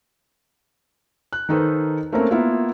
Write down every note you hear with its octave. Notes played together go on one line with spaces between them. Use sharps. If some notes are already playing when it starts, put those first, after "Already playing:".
F#6
D#3 D#4 A4 B4 C5
A3 A#3 C4 C#4 A#4
A#3 B3 E4 F4